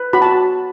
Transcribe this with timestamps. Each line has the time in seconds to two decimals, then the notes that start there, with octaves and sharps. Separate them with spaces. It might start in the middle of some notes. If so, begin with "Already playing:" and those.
Already playing: B4
0.13 F#4 B5
0.22 A5